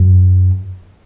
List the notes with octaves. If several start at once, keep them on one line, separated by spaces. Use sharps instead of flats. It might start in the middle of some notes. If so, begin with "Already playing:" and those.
Already playing: F#2